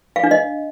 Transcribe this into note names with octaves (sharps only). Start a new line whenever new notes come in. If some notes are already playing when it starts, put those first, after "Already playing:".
F5
D4
D#5